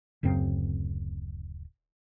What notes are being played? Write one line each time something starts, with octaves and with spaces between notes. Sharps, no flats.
D1 F#2 C#3 C4